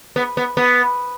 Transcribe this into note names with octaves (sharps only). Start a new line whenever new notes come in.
B3
B3
B3